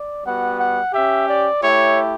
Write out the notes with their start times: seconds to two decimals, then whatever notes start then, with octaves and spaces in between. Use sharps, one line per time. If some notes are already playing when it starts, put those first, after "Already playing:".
Already playing: D5
0.24 G3 B3 F#4 F#5
0.59 F#5
0.92 C#4 G4 E5
1.27 D5
1.61 A3 E4 G4 C#5